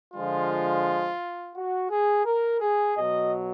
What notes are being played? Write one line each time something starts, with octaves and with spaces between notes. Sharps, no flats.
D3 F3 G#3 F4
F#4
G#4
A#4
G#4
B2 F#3 D#5